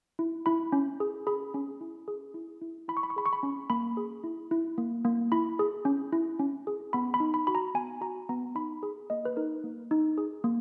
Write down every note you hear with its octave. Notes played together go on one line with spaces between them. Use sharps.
E4
E4 B5
C#4
G#4
G#4 B5
C#4
E4
G#4
E4
E4
E4 B5
C#6
B5
C#6
G#4 B5
C#6
B5
C#4
A#3 B5
G#4
E4
E4
A#3
A#3
E4 B5
G#4
C#4
E4
C#4
G#4
B3 B5
B5
D#4
B5
F#4 B5
A#5
B3 G#5
F#4 A#5
B3 A#5
D#4 B5
G#4
A#3 D#5
B4
D#4 A#4
A#3
D#4
G#4
A#3